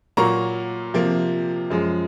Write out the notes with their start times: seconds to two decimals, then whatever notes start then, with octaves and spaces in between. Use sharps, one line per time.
0.17 A#2 F#3 A#3 A#5 C#6
0.94 C3 F3 A#3
1.70 F#2 F3 G#3